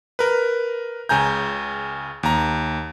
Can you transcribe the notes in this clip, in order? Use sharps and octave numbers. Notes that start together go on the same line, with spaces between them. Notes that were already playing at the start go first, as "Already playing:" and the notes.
A#4 B4
C#2 C#3 G#5 A#5 G6
D#2 A#5